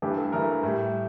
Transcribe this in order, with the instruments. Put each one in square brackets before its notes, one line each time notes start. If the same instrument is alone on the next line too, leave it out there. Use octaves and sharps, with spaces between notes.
[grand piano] G2 E3 A3 G4
A4
G2 E3 A3 A#4
A2 G3